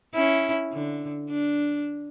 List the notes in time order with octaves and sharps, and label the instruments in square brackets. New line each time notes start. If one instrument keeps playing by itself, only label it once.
[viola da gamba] C#4 E4
D3
D4